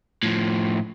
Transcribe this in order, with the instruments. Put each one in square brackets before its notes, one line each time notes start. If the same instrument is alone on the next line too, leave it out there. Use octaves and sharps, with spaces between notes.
[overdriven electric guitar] A2 F3